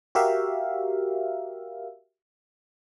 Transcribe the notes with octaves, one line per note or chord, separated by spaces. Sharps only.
F#4 G4 A#4 E5 F5